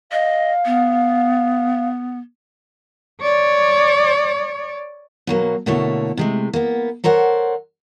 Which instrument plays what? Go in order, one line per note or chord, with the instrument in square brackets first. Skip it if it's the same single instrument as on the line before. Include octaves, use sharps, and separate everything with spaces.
[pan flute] D#5 [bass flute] F5
[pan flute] B3
[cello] C#5 D5
[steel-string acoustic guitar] B2 F#3 A#3
B2 D3 A3 A#3 E4 C#5
C3 G#3 A3
A#3 B3
A4 A#4 C5 C#5 F#5